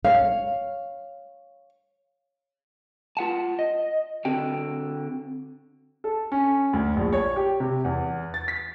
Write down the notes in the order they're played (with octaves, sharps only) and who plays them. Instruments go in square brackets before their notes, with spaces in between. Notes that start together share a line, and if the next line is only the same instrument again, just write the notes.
[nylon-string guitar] C#5 F5
[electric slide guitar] F4 F#5 A5
D#5
D3 C4 F#4 G5
[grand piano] A4
C#4
D2
A#1
C#5
G4
C3
E2
A6
B6